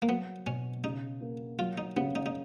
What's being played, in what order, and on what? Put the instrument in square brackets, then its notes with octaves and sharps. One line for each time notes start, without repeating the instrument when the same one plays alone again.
[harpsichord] A#3
[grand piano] F#3 [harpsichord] B3
[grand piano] B2 [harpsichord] C#4
[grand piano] C#3 [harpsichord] D#4
[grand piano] A#3
[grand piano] F#3 [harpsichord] F4
[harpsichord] D#4
[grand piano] C#3 [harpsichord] B3
[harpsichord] D#4
D#4